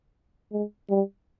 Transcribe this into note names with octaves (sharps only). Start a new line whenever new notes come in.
G#3
G3